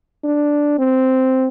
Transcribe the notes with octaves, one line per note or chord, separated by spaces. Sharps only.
D4
C4